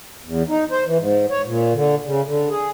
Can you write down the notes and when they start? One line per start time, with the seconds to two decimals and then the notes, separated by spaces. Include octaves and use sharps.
0.24 E2
0.49 D#4
0.71 C5
0.85 E3
0.98 G#2
1.30 C#5
1.45 A#2
1.73 D3
2.05 C#3
2.26 D3
2.50 G#4